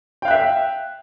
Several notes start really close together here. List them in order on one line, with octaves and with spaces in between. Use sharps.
G5 F5 F#6 E5